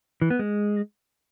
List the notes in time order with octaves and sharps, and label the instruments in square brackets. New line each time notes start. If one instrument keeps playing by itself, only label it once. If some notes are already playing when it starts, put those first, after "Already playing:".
[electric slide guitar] E3
B3
G#3